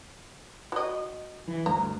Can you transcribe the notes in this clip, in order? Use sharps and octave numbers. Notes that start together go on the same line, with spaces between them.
F#4 D#5
E3
D2 G2 A#5